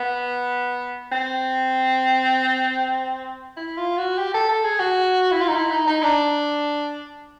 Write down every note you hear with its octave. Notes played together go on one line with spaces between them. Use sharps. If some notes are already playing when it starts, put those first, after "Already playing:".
Already playing: B3
C4
E4
F4
F#4
G4
A4
A4
G#4
F#4
E4
F4
D#4
E4
D#4
D#4
D4